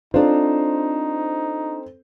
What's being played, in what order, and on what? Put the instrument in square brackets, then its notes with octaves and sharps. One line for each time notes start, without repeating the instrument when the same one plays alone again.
[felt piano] C4 A4 C5 [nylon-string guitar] D4 F4 [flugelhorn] D#4